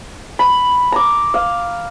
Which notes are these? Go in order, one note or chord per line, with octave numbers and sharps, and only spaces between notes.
B5
A#5 D6
F5